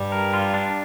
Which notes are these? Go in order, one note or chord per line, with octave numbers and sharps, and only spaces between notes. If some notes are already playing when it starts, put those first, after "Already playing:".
Already playing: G2 G3
A#4
F4
D4